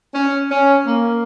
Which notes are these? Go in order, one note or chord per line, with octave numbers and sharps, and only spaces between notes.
C#4
C#4
A#3